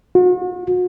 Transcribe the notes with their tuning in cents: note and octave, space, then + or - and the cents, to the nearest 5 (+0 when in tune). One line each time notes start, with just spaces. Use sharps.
F#4 -40